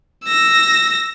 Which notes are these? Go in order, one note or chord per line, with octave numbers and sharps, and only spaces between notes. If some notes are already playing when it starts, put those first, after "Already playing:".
E6 A#6